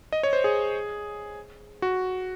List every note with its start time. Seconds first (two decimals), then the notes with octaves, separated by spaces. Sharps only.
0.12 D#5
0.23 C#5
0.33 C5
0.44 G#4
1.82 F#4